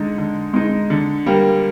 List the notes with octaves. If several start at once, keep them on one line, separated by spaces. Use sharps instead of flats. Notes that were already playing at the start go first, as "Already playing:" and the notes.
Already playing: D3 G#3 D#4
D3
G#3 D#4
D3
G3 A#3